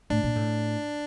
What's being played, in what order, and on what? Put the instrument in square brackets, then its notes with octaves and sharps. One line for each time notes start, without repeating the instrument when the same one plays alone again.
[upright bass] A2 [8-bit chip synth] D4
[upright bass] A#2
A2